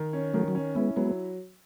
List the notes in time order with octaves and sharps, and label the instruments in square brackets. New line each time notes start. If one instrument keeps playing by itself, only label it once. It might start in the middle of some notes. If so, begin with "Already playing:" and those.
Already playing: [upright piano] D#3
C#4
[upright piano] D#3 [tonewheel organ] F#3 A3
[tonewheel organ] F#3
[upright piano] C#4
[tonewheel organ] G#3 B3 [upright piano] E4
[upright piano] F#3 [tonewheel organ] G#3 B3